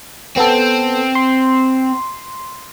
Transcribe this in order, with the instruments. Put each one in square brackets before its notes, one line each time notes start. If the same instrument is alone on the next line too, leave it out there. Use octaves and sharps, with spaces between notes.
[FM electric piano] B3 A4 [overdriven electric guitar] C4
[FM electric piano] C6